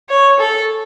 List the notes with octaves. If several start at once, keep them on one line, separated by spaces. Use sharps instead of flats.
C#5
A4